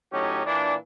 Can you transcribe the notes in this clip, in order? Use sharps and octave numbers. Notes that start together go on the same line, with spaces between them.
A2 F#3 C#4 D#4 G4
A#2 E3 D4